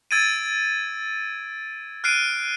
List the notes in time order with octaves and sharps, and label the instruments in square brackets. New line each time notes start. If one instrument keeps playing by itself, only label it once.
[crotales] E6 G#6 A6 D7 D#7
F6 F#6 C7 D7 D#7